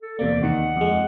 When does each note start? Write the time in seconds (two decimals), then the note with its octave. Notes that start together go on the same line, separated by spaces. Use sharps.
0.02 A4
0.19 E2 C3 A#3 D5
0.43 D#2 D#3 F#5
0.76 F2 G#3